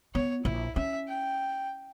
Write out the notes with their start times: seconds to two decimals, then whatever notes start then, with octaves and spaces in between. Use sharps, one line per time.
0.15 B3 C#5
0.45 A#1 E4
0.76 C#4 E5
1.08 G5